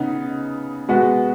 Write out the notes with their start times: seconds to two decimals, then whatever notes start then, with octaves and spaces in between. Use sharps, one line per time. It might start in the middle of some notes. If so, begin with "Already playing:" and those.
Already playing: C#3 B3 D#4
0.89 G#3 B3 F#4